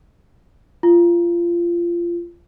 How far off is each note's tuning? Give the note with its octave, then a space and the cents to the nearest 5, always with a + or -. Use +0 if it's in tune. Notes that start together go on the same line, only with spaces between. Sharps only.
F4 -20